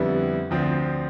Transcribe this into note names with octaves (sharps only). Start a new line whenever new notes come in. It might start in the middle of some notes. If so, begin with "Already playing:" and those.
Already playing: F2 D3 G3 B3 E4
D2 D3 F3 C4